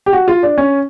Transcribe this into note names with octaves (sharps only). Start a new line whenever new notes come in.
G4
F#4
F4
D4
C#4